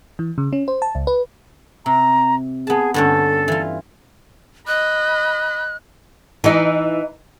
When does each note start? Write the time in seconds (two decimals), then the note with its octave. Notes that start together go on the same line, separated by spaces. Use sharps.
0.19 E3
0.38 C#3
0.53 C#4
0.68 C5
0.82 A5
0.95 C#2
1.07 B4
1.86 C3 A#5
2.67 B3 G#4 A5
2.94 G2 D3 C#4 A4
3.48 E3 F4
4.67 D#5 B5 F#6
6.44 E3 D#4